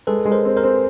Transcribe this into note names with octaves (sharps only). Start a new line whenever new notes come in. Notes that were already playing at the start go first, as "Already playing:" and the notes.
G#3 A4 B4
G#3
A#4 C5
C4
A#4 C5
C4